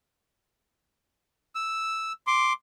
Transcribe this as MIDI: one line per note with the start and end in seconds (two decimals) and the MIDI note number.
1.55 2.12 88
2.27 2.53 84
2.27 2.53 86